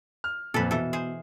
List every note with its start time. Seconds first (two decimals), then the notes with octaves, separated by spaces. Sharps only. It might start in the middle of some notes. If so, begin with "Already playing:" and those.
0.24 F6
0.54 F2 A#2 A4 B4
0.71 B2 E3 A4
0.93 G#4 C5